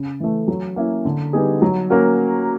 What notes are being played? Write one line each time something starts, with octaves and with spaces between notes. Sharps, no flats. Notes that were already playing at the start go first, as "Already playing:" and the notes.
Already playing: C#3
E3 A3
F#3
A#3 C#4 E4
D3
G3 B3 D#4 G#4
F#3
A#3 C#4 F#4 A#4